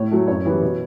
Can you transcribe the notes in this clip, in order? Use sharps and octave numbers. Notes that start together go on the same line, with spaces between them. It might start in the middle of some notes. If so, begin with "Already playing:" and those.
Already playing: A2 C#5
F#3 A3
F#2 C#5
E3 G3 B3
B2